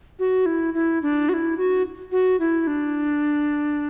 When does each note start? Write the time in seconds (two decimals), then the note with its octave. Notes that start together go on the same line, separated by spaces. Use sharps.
0.19 F#4
0.46 E4
0.74 E4
1.02 D4
1.29 F#4
1.34 E4
1.57 F#4
2.12 F#4
2.40 E4
2.67 D4